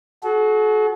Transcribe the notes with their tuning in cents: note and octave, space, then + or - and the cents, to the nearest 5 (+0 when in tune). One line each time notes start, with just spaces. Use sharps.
F#4 +0 A4 -45